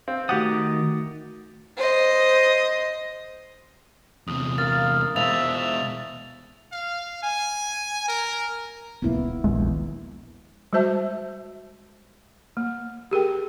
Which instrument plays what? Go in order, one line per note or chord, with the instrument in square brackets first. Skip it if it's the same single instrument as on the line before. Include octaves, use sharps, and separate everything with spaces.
[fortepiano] C4 [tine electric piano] F5
[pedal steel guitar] D#3 D6 D#6 [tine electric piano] A3 F#4 A6 [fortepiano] G4 F#5
[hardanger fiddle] C5 D#5
[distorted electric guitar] E2 C3 [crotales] D#6
[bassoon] A#3 [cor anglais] F5 [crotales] A6
[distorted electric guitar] B2 G#3 [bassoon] F3 [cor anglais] E5 [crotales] A6 F7
[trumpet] F5
G#5
A#4
[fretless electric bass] D#1 C#2 A#3 [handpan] B3 E4
[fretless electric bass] E1 A#1 D#2 [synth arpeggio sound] G#3
[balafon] G3 G#3 F#4 C5 E5 A5
A#3
G4 G#4 A#4 G5